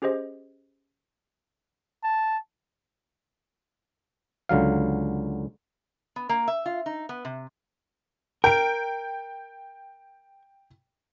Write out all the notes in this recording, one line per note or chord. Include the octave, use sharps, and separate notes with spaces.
C#4 G4 G#4 C5 D#5
A5
C#2 D3 F#3 F5
B3
A#3
E5
F4
D#4
B3
C3
A#4 G5 D7